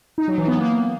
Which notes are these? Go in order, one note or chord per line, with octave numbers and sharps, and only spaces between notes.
D#4
F#3
E3
B3
A#3